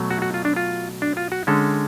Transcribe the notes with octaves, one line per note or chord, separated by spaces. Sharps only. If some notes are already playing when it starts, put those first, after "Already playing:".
Already playing: B2 F#3 A3
F#4
F#4
F4
D4
F4
D4
F4
F#4
D3 G#3 C#4 A4